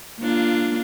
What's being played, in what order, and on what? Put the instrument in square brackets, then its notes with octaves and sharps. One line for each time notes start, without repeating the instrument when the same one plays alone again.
[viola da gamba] A#3 D4 F4